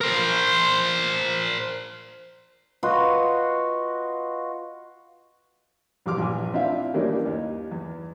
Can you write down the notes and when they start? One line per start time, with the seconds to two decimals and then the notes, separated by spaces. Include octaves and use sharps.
0.01 A#4 C5
2.83 F4 F#4 B4 D#5
6.06 A#1 E2 G3 C6 D6 F6
6.18 A#1 E2 G#5
6.53 C4 D4 E4 F4 E5 F5
6.94 D#3 E3 G3 A#3 C#4 D4
7.26 D#2
7.71 E2